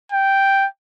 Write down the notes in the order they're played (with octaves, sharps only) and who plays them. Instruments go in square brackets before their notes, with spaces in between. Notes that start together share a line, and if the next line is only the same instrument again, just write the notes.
[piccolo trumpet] G5